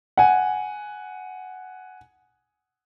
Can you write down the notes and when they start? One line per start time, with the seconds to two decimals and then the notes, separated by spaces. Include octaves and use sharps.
0.17 F#5 G#5